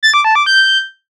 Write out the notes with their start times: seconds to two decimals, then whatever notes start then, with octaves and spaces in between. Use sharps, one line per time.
0.03 A6
0.14 D6
0.25 A5
0.35 D6
0.46 G6